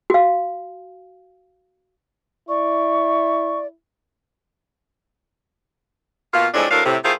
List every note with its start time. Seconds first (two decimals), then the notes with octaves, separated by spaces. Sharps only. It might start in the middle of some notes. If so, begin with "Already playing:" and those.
0.10 F#4 F5
2.49 E4 D5 C#6
6.33 B2 A#3 F4
6.54 F2 A2 G3 G#3 C4 D4
6.71 D2 A2 D4 A4 A#4 F5
6.85 A2 C3
7.04 D#3 A3 E4 F4 G#4 C5